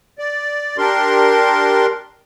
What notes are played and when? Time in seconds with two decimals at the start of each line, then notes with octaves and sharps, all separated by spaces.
0.19 D5
0.78 D4 G4 A#4 C6